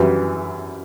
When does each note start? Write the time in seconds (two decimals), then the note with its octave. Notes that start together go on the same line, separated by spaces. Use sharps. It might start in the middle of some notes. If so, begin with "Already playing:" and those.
Already playing: F#2 E3 G3